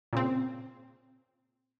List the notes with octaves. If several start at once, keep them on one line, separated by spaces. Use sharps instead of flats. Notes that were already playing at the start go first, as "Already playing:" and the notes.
A#2 C#3 C4